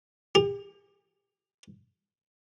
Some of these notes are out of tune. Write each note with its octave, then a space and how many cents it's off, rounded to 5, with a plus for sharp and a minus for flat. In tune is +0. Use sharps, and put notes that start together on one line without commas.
G4 +40